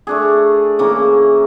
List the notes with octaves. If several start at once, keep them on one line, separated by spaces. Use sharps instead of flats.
A3 D4 G#4
C#3 E3 A#3